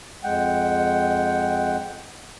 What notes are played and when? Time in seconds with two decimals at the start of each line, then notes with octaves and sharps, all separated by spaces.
0.24 F2 G#3 F#5 G5